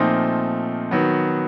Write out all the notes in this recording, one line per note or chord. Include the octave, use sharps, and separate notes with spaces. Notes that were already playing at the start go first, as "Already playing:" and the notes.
Already playing: A#2 F3 A3 C4 D#4
D#3 F#3 B3